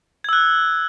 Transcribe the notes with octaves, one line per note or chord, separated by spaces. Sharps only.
E6 F#6 G#6